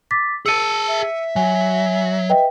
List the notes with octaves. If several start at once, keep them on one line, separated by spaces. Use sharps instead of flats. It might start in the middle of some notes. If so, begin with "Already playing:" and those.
D6 A6 B6
G#4 A5 E6 C#7 D#7
E5
F#3 G#5
B4 D#5 G5